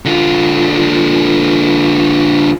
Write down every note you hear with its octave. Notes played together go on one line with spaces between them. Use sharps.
D3 F4